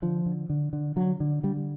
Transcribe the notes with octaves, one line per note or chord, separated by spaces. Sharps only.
D3 F3
D3
D3
D3
D3 F#3
D3
D3 G3